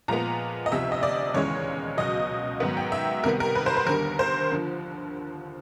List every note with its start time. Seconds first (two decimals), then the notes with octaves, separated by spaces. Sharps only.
0.08 A#2 F3 G#3 B3 A#5
0.66 D#5
0.71 D2 C3 F3 E5
0.92 D#5
1.03 D5
1.34 D#2 C#3 E3 G#3 C#5
1.97 C#2 B2 F#3 D#5
2.60 G#2 D#3 F#3 B3
2.77 G5
2.92 E5
3.24 C2 C3 D#3 G3 B3 A#4
3.40 A#4
3.55 B4
3.66 C5
3.77 B4
3.87 D#2 D3 G3 A#4
4.19 C5
4.52 D3 F3